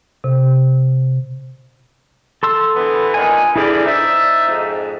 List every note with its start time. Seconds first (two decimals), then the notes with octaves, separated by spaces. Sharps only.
0.24 C3
2.43 A4 C6 E6
2.75 D3 E3 B3
3.14 A#2 D3 D#3 G#5
3.56 D3 E3 G3 E4 G#4 D5
3.85 D#4 C5 D5 E5
4.48 F2 G#2